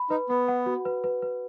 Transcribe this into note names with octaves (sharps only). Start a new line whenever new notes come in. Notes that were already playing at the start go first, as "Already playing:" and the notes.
Already playing: B5
D#4 B4
B3 B5
F#5
F#4
B4
B4
B4